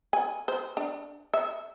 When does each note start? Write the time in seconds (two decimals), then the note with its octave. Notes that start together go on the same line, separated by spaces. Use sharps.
0.13 G#5
0.48 C5
0.77 D4
1.34 E5